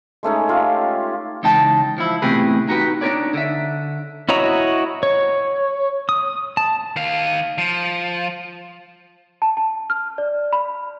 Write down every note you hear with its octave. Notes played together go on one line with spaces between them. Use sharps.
G#3 A3 C#4 D#4
F4 G4 F5
C#2 E3 D#4 G5 A5
F3 E4
E2 A2 C3 G4 G#4 B4
D#4 F#4 G4 B4
D4 D#4 F4 B4 C#5 D5
D3 E5
E4 F#4 C#5 D#5 A#5
C#5
D#6
A5
D#3 F5
F3
A5
A5
F6
D5
B5